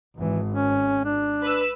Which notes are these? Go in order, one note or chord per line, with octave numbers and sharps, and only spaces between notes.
G#1 E3
C#4
D4
B4 E6